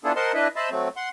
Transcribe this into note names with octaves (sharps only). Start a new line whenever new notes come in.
B3 D4 E4 F4 G#4 A4
A#4 C5 D#5 F#5 A5 C6
D4 E4 B4 D#5 E5
C5 D#5 E5 A5 B5
F#3 A3 C4
F#5 C6